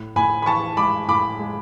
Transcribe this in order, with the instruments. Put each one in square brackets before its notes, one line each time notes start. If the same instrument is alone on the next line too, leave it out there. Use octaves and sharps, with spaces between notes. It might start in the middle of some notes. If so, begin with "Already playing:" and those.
Already playing: [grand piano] A2
A2 G#5 B5
B5
E3 A5 C#6
G#3 B5 D6
A2 B5 D6
G#3